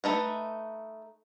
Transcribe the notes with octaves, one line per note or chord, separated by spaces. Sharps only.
A3 D#4 B4